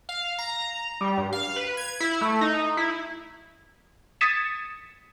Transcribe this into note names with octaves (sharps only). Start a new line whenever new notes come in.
F5
A#5
G3
G2
F5
B4
G#6
E4
A3
D#4
E4
D#6 G#6 A6 B6 C#7 E7